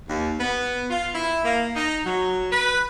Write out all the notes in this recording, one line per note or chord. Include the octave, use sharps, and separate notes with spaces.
D#2
B3
F4
E4
A#3
D#4
F#3
B4